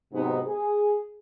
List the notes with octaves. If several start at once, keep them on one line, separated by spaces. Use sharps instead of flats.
G#2 C3 F#3 B3 C4 D#4
G#4